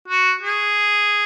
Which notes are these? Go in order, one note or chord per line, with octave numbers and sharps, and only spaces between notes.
F#4
G#4